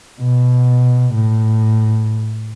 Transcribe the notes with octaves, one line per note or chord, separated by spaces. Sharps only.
B2
A2